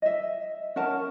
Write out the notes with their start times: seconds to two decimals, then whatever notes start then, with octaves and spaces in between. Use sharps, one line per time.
0.02 D#5 E5
0.76 C#4 A#4 F#5 A5